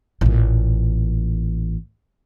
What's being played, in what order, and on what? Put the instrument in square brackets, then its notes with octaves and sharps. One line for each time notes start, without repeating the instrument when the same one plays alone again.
[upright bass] A1 A#2